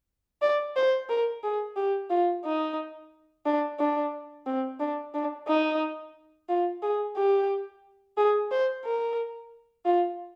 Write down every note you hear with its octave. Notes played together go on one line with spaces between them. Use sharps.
D5
C5
A#4
G#4
G4
F4
D#4
D4
D4
C4
D4
D4
D#4
F4
G#4
G4
G#4
C5
A#4
F4